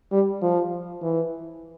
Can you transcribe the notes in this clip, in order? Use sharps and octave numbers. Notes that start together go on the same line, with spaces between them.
G3
F3
E3